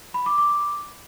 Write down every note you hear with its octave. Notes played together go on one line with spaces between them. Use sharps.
B5
D6
D6